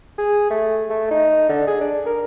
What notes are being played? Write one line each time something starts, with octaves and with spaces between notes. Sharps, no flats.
G#4
A3
A3
D#4
D3
G#4
D4
A#4